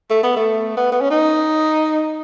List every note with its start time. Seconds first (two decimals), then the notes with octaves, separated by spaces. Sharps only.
0.10 A3
0.23 B3
0.37 A3
0.77 B3
0.92 B3
1.01 C#4
1.11 D#4